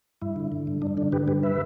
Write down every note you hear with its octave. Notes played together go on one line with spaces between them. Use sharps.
G2 E4
D3
D3
G2
G2 D4
D3 D4
D3 G4 B4
G2 G4 B4
B4 E5